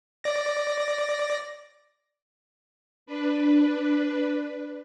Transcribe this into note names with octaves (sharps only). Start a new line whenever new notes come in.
D5 A#6
D4 B4